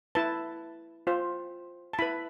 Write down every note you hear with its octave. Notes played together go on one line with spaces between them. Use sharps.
E4 B4 A5
F4 C5
A5
E4 B4 B5